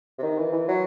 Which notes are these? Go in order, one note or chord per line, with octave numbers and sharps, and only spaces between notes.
C3
D#3
E3
E3
F#3